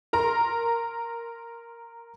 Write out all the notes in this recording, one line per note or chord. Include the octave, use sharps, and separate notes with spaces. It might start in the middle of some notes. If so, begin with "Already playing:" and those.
A#4 A#5 C6